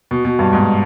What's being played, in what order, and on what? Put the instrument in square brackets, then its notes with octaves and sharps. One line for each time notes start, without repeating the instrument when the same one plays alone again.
[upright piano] B2
B2
G2
G#2